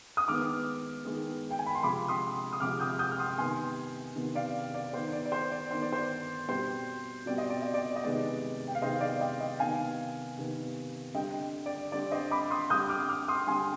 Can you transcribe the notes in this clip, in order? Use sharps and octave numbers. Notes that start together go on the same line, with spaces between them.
D#6
D#3 G#3 B3 D6 F6
D#3 G#3 B3
G5
G#5
B5
C6
C3 F3 G#3 B5 D6
C6 D#6
D#6
C3 F3 G#3 D6 F6
D#6 G6
D#6 G6
F6
C6 D#6
C3 D#3 B3 G#5 C6
C3 D#3 B3
D5 F5
D5
D#3 B3 C5
D5
D5
C5
D5
D#3 B3 C5
D5
C5
B2 G3 C4 C5
B2 G3 C4 D5
D#5
D5
D#5
D5
D#5
C3 D#3 G#3 B3 D5
G5
F5
C3 D#3 G#3 B3 C5 D#5
D5 F5
D#5 G5
D#5 G5
C3 D#3 B3 F5 G#5
C3 D#3 B3
D3 G3 C4 D#5 G5
D5
D3 G3 C4 D5
C5 D#5
B5 D6
C6 D#6
D3 G3 C4 D#6 G6
D6 F6
D6 F6
C6 D#6
D3 G3 C4 G#5 C6